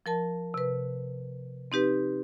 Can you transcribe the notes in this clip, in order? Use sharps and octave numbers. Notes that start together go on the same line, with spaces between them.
F3 A#4 A5
C3 B4
C4 D#4 G4 B4